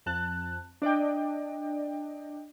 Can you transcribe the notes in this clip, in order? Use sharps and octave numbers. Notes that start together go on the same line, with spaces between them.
F2 A5 F#6
D4 D5 D#5 G5